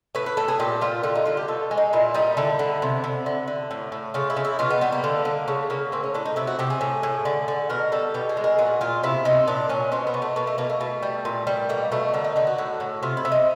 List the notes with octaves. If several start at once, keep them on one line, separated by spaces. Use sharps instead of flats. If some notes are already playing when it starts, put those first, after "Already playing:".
A2 B4
B4
A2 A4
G#4
A#2 G4
G3 F4
D3 F4
D#4
D3 F4
G4
B2 A4
G#3
D#4
A#2 E4
G3 D#4
D3 E4
D3
C3
C3
D3
D3
A2
A2
C#3 F4
E4
C#3
E4
B2 F4
B3
G3 B3
A#3
D3
D3
C#3 A3
C#3 A#3
A2 C4
C#4
A2 D4
D#4
C3 E4
F#4
C3 G4
G#4
A2
A2
D3
D3
B2 A#4
G3 A4
B2 G4
G#4
G#3
A#4
A#2 F#4
A#2 F4
C3 E4
C3 D#4
A#2 D4
A#2 C#4
B2 C4
B3
B2
A3
B2 A#3
A3
B2 A#3
A3
B2
G3
A#2
G3
B2 A#3
B2 A3
D3 A#3
D#4
D3 D#4
F#4
A2
A2
C3 F4
E4
C3
D#4